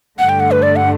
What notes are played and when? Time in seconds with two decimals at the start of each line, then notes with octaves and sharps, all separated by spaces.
0.19 G2 D3 A3 F#5
0.29 G5
0.40 F#5
0.51 B4
0.63 D5
0.76 F#5